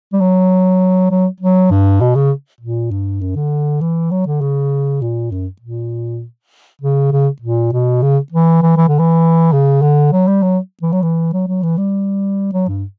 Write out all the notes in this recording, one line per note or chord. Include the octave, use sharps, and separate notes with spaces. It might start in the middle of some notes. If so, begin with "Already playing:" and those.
G3
F#3
F#3
F#3
G2
B2
C#3
A#2
G2
F#2
D3
E3
F#3
D3
C#3
A#2
F#2
A#2
C#3
C#3
A#2
B2
C#3
E3
E3
E3
D3
E3
C#3
D3
F#3
G3
F#3
E3
F#3
E3
F#3
F#3
E3
G3
F#3
G2